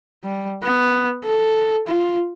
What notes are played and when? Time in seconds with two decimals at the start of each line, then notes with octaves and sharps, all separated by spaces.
0.24 G3
0.63 B3
1.25 A4
1.87 F4